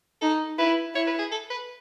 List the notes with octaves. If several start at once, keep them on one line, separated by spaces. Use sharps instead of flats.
D#4 A4
E4 B4
E4 C#5
B4
G#4
A4
B4